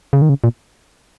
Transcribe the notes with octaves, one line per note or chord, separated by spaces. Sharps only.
C#3
D#3
C#3
A#2